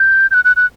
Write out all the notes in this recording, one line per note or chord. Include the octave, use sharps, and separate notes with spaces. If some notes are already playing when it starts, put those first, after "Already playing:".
Already playing: G6
G6
F#6
F#6
F#6